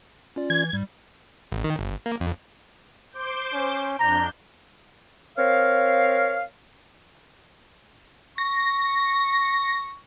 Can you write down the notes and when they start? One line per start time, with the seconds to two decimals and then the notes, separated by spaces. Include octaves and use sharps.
0.36 C#4 F4 D5
0.50 E3 G#6
0.73 G#2 G3
1.52 A1
1.64 D#3
1.79 G1
2.06 A#3
2.20 F2
3.12 C5 D6 G6
3.53 C#4
3.99 F2 D4 A#5 G6
5.37 C4 A#4 C#5 F5
8.38 C#6 A#6